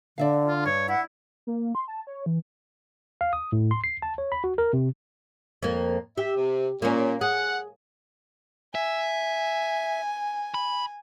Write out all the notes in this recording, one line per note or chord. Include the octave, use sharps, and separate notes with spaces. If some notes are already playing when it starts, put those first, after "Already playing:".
D3 D5 E5 F5
F4
G2 C#5
E4 F#5
A#3
C6
A5
C#5
E3
F5
D#6
A2
C6
C7
A5
C#5
B5
F#4
A#4
C3
F2 A#3
G4 E5
C3
A#2 A#3 C#4
G#4 F#5
E5 G#5
B5